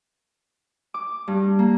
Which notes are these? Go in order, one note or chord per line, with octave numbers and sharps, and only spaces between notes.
D6
G2
A#3